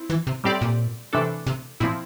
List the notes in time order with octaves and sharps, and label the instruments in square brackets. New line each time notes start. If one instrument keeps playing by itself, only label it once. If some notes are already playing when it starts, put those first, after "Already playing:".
Already playing: [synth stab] C4 E4
[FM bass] E3
C3
[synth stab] A2 G3 C4 G4 D5
[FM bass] A#2
[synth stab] C3 E3 A3 D4 A4
[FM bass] C3
[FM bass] A#2 [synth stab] F3 C4 E4